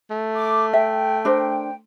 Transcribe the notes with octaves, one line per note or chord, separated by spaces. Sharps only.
A3
D6
E5 G5
D4 A#4 C5